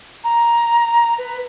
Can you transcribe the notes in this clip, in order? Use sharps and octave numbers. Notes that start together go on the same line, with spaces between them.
A#5
B4